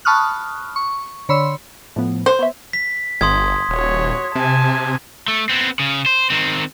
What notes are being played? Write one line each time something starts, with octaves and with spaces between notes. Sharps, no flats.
A5 B5 C#6 D#6 F6 F#6
C#6
D3 C#5 B5 C6 E6
A2 F3 B3
C5
B3 C#5 E5
B6
G1 C6 D#6 G#6
D#1 F#4 C#5
C3 G#5 A5
A3
B3 C4
C#3
C5
D#3 C4